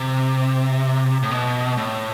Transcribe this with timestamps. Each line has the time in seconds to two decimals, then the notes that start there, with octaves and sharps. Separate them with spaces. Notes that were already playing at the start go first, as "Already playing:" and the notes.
Already playing: C3
1.23 A2
1.31 B2
1.77 A2